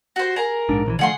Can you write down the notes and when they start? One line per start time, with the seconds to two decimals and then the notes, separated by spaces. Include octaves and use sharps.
0.16 F#4 C5
0.36 G#4 A#4 A#5
0.69 A#1 G#2 D4
0.86 A#1 D#3 E3
0.99 D3 F3 A3 G#4 F#5 C6